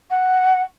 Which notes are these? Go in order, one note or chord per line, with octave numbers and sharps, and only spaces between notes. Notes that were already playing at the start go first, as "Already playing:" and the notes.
F#5